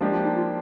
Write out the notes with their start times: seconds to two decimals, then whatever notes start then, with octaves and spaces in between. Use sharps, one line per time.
0.01 F3 G#3 A#3 D4 G4
0.12 F4
0.24 D#4
0.36 F4